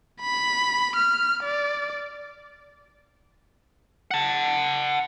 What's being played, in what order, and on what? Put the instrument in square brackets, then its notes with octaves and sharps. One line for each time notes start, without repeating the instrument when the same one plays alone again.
[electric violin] B5
F6
D5
[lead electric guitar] F#5 A5